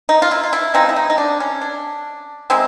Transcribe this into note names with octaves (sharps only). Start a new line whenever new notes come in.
D#4
F4
E4
F4
E4
F3 G#3 C4 D#4
E4
D#4
D#4
D4
C#4
D4
D#3 G#3 C4 E4